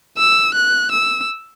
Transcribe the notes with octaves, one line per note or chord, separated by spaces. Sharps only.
E6
F#6
E6